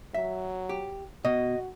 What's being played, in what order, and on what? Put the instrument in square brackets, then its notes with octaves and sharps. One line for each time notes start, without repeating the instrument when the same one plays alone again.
[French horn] F#3 [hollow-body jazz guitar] E5
[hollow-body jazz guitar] G4
[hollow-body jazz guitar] B2 [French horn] F#4 [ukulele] D#5